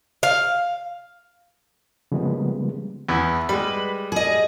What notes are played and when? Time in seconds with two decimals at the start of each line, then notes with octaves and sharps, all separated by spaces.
0.23 F5
2.12 C#3 F3 G3 G#3 A#3 B3
3.09 E2 B3 E4
3.49 G3 G#3 B4
4.12 G#4 D#5